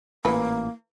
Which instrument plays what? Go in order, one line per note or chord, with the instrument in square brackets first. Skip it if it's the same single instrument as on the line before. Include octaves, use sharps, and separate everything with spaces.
[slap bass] A1 A#2 [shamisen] E3 B4 [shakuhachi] A#3